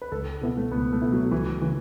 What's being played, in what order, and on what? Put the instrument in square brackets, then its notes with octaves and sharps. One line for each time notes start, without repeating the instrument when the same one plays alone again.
[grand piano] B4
[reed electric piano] C#2 [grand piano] A4
[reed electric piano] B2 B3 E4 [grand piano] A4
[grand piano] A3
[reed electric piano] C#2 [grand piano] B3
[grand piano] A3
[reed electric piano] B2 B3 E4
[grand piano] F#3
[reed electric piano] C#2 [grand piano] E3
[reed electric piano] C#3 A3 [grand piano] E3